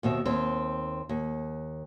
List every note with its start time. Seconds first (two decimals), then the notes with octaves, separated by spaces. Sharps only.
0.03 D#2 B2 C4 E5
0.25 D#2 C4
1.09 D#2